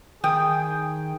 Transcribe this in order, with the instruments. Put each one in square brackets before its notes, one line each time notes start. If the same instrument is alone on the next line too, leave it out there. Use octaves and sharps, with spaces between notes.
[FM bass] D#3 [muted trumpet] G#4 [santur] G5 [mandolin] D#6